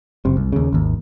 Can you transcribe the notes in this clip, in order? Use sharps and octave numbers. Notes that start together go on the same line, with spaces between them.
F#1 C3
C2
D#2 C#3
G#1 D#2